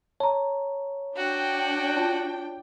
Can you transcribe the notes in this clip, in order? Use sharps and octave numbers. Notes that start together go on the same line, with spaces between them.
C#5 A5 A#5
D4 F#4 G5
F4 A5